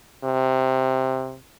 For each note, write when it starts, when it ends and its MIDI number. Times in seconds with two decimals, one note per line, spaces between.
0.24 1.36 48